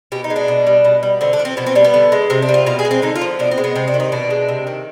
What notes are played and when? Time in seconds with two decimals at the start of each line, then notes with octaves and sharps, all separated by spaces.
0.12 B2 G4
0.24 D#4
0.30 G#3
0.36 D4
0.48 B2
0.67 G3
0.84 B2
1.03 G3
1.21 D3 C4
1.33 D4
1.39 F3
1.45 C4
1.57 B2 B3
1.67 C4
1.75 G3 D4
1.84 B3
1.94 D3
2.12 G#3
2.30 C3 C4
2.42 D4
2.49 G3
2.54 F4
2.66 B2 F4
2.79 G#4
2.85 G#3
2.91 C4
3.02 D3 D#4
3.15 F4
3.21 F3
3.39 B2 D4
3.51 C4
3.58 G#3
3.64 B3
3.75 C3 C4
3.88 D4
3.94 D#3
4.00 D#4
4.12 B2 D4
4.30 G#3
4.48 C3
4.67 D#3